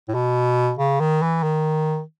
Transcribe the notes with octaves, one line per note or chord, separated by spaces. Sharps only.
A2
B2
C#3
D#3
E3
D#3